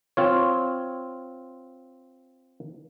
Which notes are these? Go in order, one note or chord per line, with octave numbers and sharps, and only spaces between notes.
C4 F4 C#5